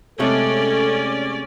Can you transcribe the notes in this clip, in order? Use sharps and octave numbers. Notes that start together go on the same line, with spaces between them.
C3 G#3 A3 C#4 A4 D5